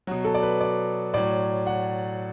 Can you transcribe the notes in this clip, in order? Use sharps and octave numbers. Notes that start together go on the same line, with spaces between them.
B2 F#3 F#4
A4
D5
B4
D5
A2 F#3 D5
F#5